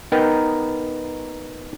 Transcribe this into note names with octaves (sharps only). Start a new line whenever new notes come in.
B3 D#4 A#4 B4 G5